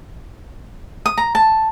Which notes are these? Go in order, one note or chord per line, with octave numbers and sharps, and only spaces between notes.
D#6
A#5
A5